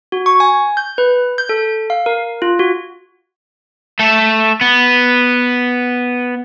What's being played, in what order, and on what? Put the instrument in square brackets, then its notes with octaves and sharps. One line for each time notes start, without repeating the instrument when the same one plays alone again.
[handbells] F#4
C#6
G#5
G6
B4
G6
A4
F5
A#4
F4
F#4
[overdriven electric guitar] A3 A4
B3